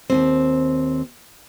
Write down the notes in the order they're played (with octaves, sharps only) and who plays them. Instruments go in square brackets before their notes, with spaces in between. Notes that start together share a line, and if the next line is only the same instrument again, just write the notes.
[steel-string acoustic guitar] D#2 G#2 C4